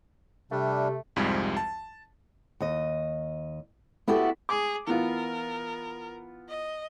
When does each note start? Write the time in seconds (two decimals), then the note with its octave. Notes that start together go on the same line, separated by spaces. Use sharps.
0.51 C3 G3 A3 D4
1.16 C2 F2 G#2 F3 G3 G#3
1.57 A5
2.60 D#2 D#5
4.07 B3 E4 F#4 G4 A4
4.49 G#4 D6
4.87 E3 B3 F4 A#4
6.49 D#5